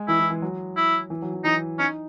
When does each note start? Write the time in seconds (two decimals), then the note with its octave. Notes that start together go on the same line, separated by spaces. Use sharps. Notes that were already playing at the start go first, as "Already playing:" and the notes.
Already playing: G#3
0.08 E3 E4
0.20 E3
0.30 E3
0.42 F#3
0.77 E4
1.10 E3
1.22 F#3
1.33 E3
1.44 E3 D#4
1.79 C#4 D#4